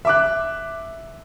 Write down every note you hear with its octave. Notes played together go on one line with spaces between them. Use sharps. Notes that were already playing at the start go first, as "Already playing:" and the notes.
E5 D6 F#6